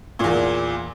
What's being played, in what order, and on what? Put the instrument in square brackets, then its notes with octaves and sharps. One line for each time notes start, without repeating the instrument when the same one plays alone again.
[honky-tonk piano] E2 A#2